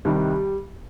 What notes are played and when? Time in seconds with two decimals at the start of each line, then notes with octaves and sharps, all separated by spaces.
0.05 C2 C3 D#3 G3